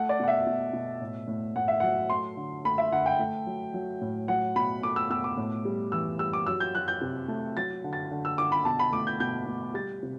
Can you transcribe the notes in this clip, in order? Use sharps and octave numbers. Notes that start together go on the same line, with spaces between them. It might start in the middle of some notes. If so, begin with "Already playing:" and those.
Already playing: A3 F#5
D5
B2 F#5
E5
B2
B2
A2
A2
A2 F#5
E5
F#3 F#5
A3 C6
D3
A3 B5
E5
D3 F#5
G5
A3
F#3
F#3
A2
F#3 F#5
B2 B5
A3 D6
E6
B2 E6
D6
A2
G3
E3 E6
G3 E6
D6
F#3 E6
G6
F#3 F#6
G6
C3
A3
F#3 A6
D3
A6
D3
E6
D3 D6
B5
B2 A5
B5
A3 D6
G6
B2 G6
A3
G3 A6
C3